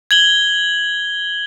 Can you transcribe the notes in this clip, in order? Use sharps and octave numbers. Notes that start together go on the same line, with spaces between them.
G#6 F#7 G7